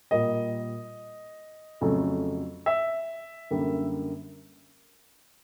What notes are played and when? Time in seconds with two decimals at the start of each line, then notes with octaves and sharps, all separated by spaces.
0.11 A#2 G3 A#3 D#5
1.81 F2 C#3 F#3 A3
2.66 E5
3.51 F#2 D3 G3 A#3